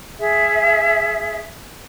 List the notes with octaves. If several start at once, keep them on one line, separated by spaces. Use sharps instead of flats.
G#4 E5